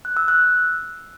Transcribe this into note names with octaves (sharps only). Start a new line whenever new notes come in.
F#6
E6
F#6